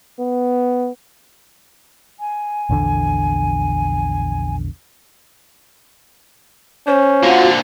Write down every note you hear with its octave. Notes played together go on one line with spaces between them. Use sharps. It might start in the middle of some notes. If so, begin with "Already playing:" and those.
B3
G#5
A#1 E2 D3
C#4 C5
A#2 D3 F4 F#4